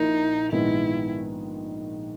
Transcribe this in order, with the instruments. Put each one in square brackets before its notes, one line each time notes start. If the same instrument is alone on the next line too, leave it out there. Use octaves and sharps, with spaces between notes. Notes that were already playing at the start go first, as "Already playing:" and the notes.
Already playing: [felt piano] A#1 A#2 A#3 E4 A#4 [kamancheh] D#4
[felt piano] A#1 G#2 D#3 G#3 B3 [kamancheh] E4